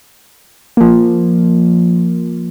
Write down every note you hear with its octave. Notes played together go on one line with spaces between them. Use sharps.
F3 A#3